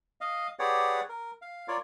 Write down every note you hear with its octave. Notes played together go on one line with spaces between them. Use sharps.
D#5 F5
G4 G#4 B4 C#5 D5 F#5
A#4
F5
F4 A#4 C#5 D5